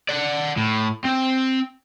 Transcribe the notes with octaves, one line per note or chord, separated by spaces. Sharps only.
D5 F#5
A2
C4